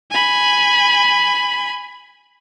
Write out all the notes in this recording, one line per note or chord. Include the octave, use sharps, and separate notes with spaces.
G#5 B5